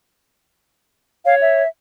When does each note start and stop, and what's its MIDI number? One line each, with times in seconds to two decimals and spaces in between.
1.25 1.62 73
1.25 1.35 77
1.41 1.68 76